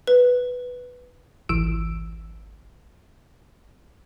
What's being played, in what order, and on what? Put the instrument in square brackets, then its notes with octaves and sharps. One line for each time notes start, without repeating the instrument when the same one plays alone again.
[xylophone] B4
[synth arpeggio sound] G#1 C#2 E3 E6 D7